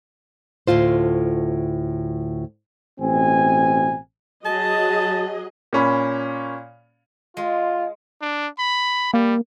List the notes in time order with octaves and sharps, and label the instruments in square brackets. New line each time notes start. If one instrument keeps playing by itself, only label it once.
[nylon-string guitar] D2 A2 F4 C5
[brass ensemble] A1 B2 C4 G#5
[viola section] F#3 G#4 D#5 [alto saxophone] A5
[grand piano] A#2 C#4 B5
[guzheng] G#3 [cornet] F4
[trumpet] D4
B5
[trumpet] G3 [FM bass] A#3